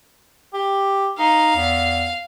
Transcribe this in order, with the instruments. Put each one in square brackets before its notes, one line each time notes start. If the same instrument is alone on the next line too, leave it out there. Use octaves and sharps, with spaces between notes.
[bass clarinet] G4
[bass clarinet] D#4 [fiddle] F5
[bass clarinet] E2